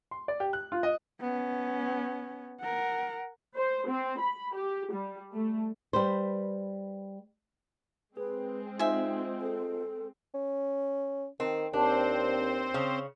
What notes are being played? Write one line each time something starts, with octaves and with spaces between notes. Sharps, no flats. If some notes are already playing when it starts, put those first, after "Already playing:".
C6
D5
G4
F#6
F4
D#5
B3 C#4
A#4 F#5
C5
C4
B5
G4
G3
A3
G3 B4 C5
G#3 C4 G#4 B4
D#4 F4 C5 D#5 E5 G#5
A4
C#4
D#3 C4
D#2 C4 D4 C5
C#3 C#5